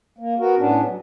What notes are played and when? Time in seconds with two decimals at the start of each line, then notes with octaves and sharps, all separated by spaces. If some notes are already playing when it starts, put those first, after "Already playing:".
0.19 A#3
0.39 B3 F#4 A#4
0.58 A2 B3 C#4 D4
0.87 F#3